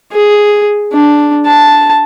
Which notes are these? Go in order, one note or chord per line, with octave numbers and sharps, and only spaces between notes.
G#4
D4
A5